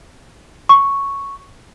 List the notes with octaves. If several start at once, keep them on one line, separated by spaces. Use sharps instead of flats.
C#6